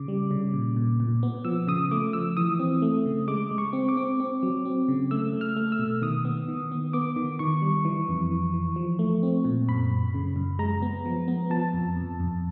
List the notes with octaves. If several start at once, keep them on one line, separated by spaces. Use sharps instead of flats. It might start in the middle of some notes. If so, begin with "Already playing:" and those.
Already playing: C#3 D6
G3
C#3
A#2
A#2
A#2
B3
F3 E6
C#3 D#6
A3 D6
F3 E6
E3 D#6
C4
A3
C#3
G#3 D6
G#3
C#6
C4
D6
C4
C4
F#3
C4
C#3
A3 E6
A3
F6
A3
E6
B2
D#3 D#6
B3
D#3
B3
B3 D6
D#3
D#3 C#6
G3
E3
F2
E3
E3
F3
A3
C4
A#2
F#2 B5
F#2
C#3
F#2
G#3 A#5
B3
F3
B3
F3 A5
F2
F2
F2